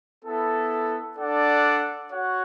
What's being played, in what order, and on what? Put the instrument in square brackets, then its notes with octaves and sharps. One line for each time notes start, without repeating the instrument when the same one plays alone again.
[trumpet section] B3 E4 A4
D4 A4 D5 F#5
F#4 C#5 F#5